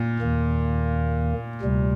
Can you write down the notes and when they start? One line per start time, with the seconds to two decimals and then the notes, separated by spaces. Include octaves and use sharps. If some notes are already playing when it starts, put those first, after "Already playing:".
Already playing: A#2
0.20 D#2 D#3 A#3
1.62 D2 C3 G3